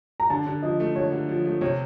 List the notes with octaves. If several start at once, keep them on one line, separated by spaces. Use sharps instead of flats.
A#5
D3 A5
D3
F3 D#5
A3
D3 C#5
D3
F3
A3
C3 C#5